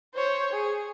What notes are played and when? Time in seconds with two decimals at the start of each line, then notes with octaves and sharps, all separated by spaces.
0.15 C5 C#5
0.53 G#4